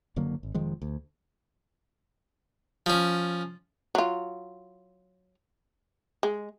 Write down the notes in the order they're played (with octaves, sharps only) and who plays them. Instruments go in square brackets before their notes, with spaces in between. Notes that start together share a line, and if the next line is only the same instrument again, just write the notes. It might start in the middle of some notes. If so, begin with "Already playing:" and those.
[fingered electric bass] F#1 D3 F#3 A#3
G#1
F1 D#3 F3 G#3
D2
[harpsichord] F3 C#4
[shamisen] F#3 F4
G#3